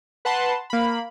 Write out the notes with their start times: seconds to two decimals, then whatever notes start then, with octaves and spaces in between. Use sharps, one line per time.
0.25 B4 F#5 A5 C6
0.70 A#3 B5